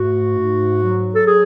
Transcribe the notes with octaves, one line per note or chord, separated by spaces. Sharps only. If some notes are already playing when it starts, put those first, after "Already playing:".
Already playing: G#2 A3 F#4
G#2
F#3
A4
G#4